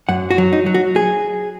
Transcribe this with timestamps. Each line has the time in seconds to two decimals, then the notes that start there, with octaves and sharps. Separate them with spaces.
0.09 F#2 F#5
0.31 F#4
0.38 F#3
0.53 D#4
0.66 F#3
0.74 F#4
0.96 G#4